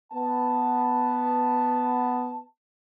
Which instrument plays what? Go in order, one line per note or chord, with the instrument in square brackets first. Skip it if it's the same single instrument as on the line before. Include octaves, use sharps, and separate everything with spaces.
[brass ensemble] B3 A5